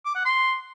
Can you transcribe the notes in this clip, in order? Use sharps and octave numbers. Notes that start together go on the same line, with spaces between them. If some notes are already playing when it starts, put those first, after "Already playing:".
D6
F#5
C6